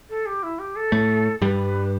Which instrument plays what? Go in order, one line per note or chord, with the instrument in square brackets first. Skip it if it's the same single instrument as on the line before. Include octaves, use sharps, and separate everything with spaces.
[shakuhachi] A4
G4
E4
G4
A4
[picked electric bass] A2 A3
[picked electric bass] G2 G3 [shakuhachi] B4